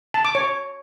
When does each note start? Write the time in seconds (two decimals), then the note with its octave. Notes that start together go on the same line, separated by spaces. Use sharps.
0.14 A5
0.25 D6
0.35 C#5